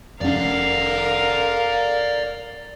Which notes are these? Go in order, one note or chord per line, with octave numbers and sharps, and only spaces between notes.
F1 C#4 A#4 D5 F5 F#5